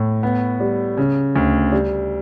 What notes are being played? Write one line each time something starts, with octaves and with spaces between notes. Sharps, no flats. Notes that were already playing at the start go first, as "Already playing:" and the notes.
Already playing: A2
B3
G3
C#3
D2
G3